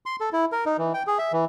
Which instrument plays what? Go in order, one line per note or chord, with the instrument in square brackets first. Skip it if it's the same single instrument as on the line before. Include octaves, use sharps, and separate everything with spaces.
[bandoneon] C6
A4
E4
A#4
D#4
E3
G5
G#4
E5
E3